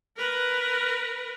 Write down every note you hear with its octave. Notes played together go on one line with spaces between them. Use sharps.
A#4 B4